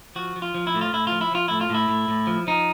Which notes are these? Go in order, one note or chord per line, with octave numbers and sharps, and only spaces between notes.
F3 F#4
F3
F4
F3
E4
A2
F4
A2 E4
F3 F4
E4
F3 F4
A2 E4
F4
A2 E4
A2
A2
F3
F3 D#4